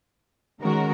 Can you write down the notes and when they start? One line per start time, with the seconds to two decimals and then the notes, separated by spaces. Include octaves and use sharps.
0.61 D#3 G#3 C#4 F#4 A#4